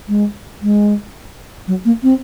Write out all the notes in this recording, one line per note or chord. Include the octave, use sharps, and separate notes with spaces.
G#3
G#3
F#3
A#3
C4